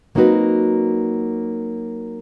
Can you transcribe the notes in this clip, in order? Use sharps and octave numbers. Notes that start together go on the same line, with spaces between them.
F#3 A#3 C4 D#4 F#4 B4